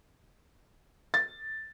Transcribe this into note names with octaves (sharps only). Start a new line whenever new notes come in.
A6